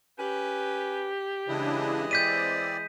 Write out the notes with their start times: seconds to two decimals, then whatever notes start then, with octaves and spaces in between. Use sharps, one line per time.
0.19 C#4 G4 B4
1.48 C#3 E3 G#3 D4 E4 D#5
2.11 C4 D5 G6 B6 D#7